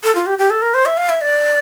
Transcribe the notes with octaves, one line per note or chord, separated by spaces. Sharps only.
A4
F4
G4
G4
A4
A#4
C5
E5
F5
E5
D5